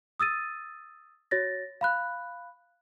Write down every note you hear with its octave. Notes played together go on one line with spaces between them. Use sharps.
D#6 E6 A6 D#7
F#4 C#5 A6 A#6
F5 B5 F#6